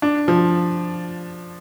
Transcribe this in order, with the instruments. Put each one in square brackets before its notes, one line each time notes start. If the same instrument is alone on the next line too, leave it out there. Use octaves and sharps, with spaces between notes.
[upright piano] D4
F3